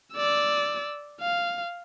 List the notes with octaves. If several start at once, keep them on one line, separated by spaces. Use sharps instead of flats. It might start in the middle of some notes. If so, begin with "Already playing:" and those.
D5 E6
F5